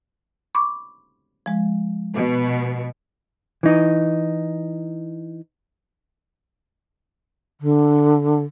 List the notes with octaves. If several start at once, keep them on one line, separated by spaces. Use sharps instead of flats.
B5 C#6 D6
F3 G#3
B2
E3 D#4
D3